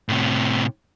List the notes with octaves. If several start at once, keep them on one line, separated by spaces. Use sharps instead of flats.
A2 C3